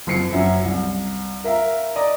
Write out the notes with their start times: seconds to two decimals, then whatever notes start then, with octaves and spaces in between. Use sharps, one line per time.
0.07 F#1 F2 C7 C#7
0.33 F#2 C#4 E5
0.65 C2
1.44 A#4 E5 F5 A#5
1.96 D5 D#5 A#5 D#6